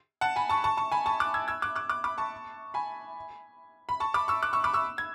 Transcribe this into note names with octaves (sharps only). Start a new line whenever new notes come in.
F#5 A5
G#5 B5
A5 C#6
A5 C#6
A5 C#6
G#5 B5
A5 C#6
D6 F#6
E6 G#6
E6 G#6
D6 F#6
D6 F#6
D6 F#6
B5 D6
A5 C#6
G#5 B5
B5
A5 C#6
B5 D6
C#6 E6
D6 F#6
C#6 E6
B5 D6
C#6 E6
G#6